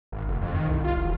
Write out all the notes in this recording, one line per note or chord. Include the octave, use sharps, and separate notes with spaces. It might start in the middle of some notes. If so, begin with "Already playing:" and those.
G#1
F1
F2
D#3
C2
F4
E1